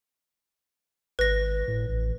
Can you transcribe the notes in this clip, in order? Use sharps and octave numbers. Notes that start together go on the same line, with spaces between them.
G#1 B4 A#6
A2
A1